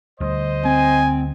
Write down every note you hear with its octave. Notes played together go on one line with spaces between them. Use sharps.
D2 D3 G3 C5 D#5
C4 G#5